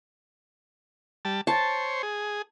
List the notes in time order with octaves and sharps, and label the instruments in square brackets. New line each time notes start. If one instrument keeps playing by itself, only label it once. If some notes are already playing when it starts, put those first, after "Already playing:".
[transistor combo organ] G3 A5
[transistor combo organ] C5 C#5 [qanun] A5
[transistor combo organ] G#4